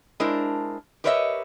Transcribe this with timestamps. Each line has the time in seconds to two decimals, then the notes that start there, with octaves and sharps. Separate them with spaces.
0.20 G#3 D4 E4 A#4 C5
1.04 G4 A#4 B4 C#5 D#5 E5